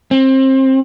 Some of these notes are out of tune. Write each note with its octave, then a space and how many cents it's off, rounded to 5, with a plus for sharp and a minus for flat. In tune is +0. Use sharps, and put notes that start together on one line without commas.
C4 +25